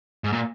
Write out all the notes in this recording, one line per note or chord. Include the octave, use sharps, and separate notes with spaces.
G#2
A#2